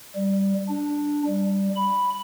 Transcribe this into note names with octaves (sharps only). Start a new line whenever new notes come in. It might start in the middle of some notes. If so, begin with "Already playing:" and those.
G3
D4
G3
B5